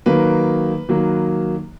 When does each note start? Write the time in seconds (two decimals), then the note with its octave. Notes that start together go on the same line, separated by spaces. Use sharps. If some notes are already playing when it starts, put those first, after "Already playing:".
0.06 D#3 F#3 A#3 B4
0.89 D#3 F#3 A#3